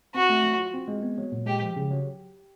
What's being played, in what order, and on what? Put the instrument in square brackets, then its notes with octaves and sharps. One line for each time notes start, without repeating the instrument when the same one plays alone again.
[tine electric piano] C4 [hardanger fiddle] F#4
[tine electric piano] A3
F#3
F4
C4
G#3
B3
F#3
A#2
[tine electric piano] G#3 [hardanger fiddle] G4
[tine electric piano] F3
C#3
F#3